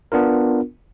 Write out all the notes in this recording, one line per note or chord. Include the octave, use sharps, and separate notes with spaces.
B3 D4 F4 A#4